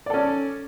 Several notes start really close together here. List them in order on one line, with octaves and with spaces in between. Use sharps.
D5 A4 C#4